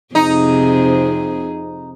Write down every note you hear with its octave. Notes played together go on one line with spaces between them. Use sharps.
F2 C3 D#4 G#4